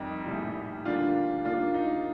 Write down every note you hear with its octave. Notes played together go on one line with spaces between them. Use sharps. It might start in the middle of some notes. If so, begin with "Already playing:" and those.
Already playing: F2 D#3 G3 D#4 G4
A#1 A2 G3
D2 D3 G3 A#3 D4 F4
D#2 D#3 A#3 D4 F4
D#4